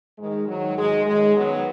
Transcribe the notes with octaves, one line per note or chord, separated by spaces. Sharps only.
G#2 D#3 G#3
G#2 D#3 F#3
G#2 D#3 G#3
F#2 D#3 G#3
F#2 D#3 F#3 B3